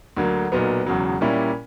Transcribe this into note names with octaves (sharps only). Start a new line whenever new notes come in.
D2 D3 F#3 A#3
B1 A#2 F#3 B3
E1 E2 C#3 F#3
A#2 G3 A#3 C#4 E4